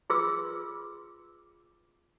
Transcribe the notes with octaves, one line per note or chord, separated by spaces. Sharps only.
F4 G#4 B4 C6 D6 E6